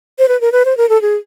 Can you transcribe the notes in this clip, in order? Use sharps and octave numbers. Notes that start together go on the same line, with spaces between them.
C5
B4
A#4
B4
C5
A#4
A4
G#4